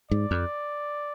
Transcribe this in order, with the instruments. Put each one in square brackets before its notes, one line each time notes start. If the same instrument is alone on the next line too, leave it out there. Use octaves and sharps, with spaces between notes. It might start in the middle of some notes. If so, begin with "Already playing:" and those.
[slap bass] G#2 [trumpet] D5
[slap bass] F2